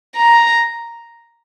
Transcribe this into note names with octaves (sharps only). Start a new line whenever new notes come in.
A#5